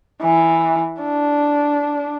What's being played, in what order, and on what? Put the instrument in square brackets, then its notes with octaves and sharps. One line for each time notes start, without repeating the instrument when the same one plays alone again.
[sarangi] E3
D4